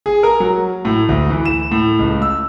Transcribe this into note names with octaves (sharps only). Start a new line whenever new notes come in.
G#4
A#4
F#3
A2
D2
E3
E7
A2
C#2
E6